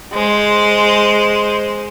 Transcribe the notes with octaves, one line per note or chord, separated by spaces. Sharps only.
G#3 C5